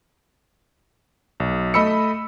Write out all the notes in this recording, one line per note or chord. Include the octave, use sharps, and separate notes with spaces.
B1
A3 D#5 B5 E6 C#7